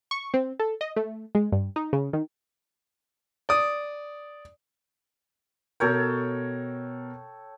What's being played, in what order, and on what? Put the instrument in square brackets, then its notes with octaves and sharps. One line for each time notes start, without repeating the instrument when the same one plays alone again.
[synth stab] C#6
C4
A4
D#5
A3
G#3
G2
D#4
C#3
D#3
[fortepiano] D5 D#6
[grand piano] B2 A#4 [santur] A4 C#5 G5